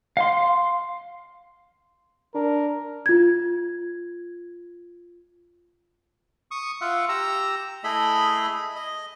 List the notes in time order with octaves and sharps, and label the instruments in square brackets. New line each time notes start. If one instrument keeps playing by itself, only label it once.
[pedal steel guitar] F5 C6
[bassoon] D4 [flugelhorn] A#4
[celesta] F4 G#6
[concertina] C#6 D#6
F4 E5 F#5
G4 A#5 E6
A3 E4 G#4 D#5 B5
D#5